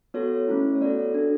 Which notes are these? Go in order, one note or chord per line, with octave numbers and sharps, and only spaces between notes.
B3 F#4 A4 C#5
A3 C#4 E4
C#5
B3 F#4 A4 D5
D4 F#4 A4